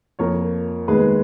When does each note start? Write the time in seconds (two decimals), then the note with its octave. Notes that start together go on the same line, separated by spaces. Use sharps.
0.19 F2 F3 A#3 A#4 C#5
0.88 D#2 D#3 G#3 B3 G#4 B4